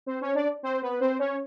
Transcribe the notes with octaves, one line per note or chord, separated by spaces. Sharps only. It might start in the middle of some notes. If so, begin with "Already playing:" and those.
C4 C5
C#4 C#5
D4 D5
C4 C5
B3 B4
C4 C5
C#4 C#5